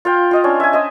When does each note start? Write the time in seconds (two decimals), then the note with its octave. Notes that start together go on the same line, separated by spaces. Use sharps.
0.05 F4 F5 G5
0.31 F4 D#5 F5
0.44 C#4 D4
0.60 E5 G#5
0.73 C5 D#5 E5